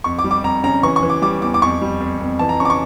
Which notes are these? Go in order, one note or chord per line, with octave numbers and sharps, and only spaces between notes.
F2 C#6
D6
G3
D6
F2 A#5
C#3 A#5
E3 C#6
C#6
E3
D6
G3 D6
E2 D6
D6
F2 C#6
G3
F2
F2
E3 A5
A#5
C#3 C#6
D6
C#6